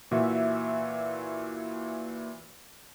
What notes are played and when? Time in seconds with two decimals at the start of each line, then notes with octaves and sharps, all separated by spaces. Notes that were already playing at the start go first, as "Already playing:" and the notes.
0.11 A#2 E3 F#4 E5